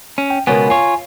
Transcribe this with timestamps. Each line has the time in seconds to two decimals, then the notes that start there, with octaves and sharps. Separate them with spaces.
0.18 C#4
0.30 G5
0.47 C#2 B2 B3 A#4 C#5 G#5
0.70 F4 C#5 G#5